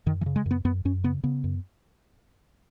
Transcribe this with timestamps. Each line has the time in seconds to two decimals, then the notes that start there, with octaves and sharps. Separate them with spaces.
0.06 F#2 D#3
0.21 E3
0.26 C#3
0.36 G#3
0.46 F#2
0.51 B3
0.65 F#2 B3
0.85 F#2 C#4
1.04 C#3 B3
1.24 C#3 B3
1.44 F#2